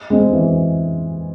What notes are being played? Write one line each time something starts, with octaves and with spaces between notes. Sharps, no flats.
G#3 C4
E3